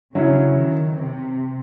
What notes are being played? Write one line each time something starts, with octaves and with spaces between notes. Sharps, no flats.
C#3 F#3 C#4 E4
D#3
C3